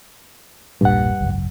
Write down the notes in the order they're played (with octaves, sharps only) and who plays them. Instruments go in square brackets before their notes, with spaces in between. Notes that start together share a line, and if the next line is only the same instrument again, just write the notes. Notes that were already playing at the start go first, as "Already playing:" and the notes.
[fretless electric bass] E1 A#1 A#2 [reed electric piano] G2 F#5
[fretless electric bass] G#1 C#2 F#2